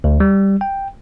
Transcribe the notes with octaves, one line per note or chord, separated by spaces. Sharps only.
D2
G3
G5